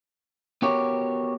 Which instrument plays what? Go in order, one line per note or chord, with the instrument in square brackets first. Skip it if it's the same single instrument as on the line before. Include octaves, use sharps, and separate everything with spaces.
[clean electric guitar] B3 F#4 G4 A#4 C#5